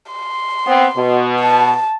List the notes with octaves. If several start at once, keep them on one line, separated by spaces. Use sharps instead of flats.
C6
B3 C4
B2
A5